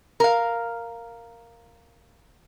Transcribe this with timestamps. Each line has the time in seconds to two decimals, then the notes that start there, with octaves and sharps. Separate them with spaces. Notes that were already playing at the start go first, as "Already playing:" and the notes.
0.20 A#4 F5